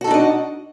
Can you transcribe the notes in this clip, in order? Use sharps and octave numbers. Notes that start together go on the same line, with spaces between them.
D4 D#4 F#4 A4 D#5